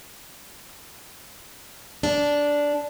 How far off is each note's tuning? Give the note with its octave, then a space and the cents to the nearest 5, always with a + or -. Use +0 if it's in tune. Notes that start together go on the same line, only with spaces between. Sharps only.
D4 -10